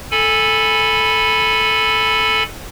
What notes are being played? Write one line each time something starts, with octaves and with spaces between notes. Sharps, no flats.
A4 G#5 B5